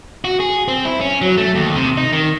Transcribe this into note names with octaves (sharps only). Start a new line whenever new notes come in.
F#4
G#4
C4
E4
C#4
F#3
A3
D#2
C3
D#4
D#3